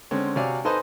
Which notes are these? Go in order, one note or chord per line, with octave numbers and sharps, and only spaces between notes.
D3 G#3 C4 C#4
C3 F#4 C#5 D5 F5 G#5
D#4 A4 B4 C5 D#5 G#5